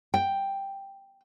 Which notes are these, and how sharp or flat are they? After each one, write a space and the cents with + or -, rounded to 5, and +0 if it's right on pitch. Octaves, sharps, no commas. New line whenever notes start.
G5 +5